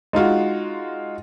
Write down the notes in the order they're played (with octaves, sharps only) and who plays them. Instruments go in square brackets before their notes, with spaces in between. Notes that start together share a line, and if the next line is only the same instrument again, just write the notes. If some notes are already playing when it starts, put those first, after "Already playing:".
[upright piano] G#3 D#4 F4 F#4